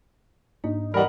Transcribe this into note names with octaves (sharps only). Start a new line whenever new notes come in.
G#2 A#3 D4 D#4
E3 G3 A#4 D#5 F#5 B5